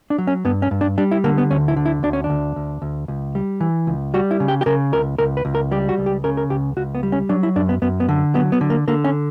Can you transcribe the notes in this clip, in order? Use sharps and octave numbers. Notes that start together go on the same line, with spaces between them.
D4
F#3
C#4
G2 B3
C#4
G2
D4
G3 D4
E4
D3 A#3
B3
D2 C#4
E4
D3
E4
D2 D4
C#4
D4
D2
D2
D2
C#2
G3
E3
C#2
G3 F#4
E4
C#3
G4
G4
C#3 A#4
C#2 A#4
C#2 A#4
B4
C#2
A#4
G3 G4
F#4
C#2
G4
C#3 A#4
A#4
C#2 G4
C#2 F#4
B3
G3
C#4
F#3 D4
E4
F#2 D4
B3
F#2 B3
B3
D3
F#3 B3
B3
D3
A#3
D3 A#3
C#4